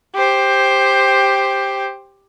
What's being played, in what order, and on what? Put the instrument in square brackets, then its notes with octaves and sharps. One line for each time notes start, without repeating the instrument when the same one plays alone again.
[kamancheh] G4 C5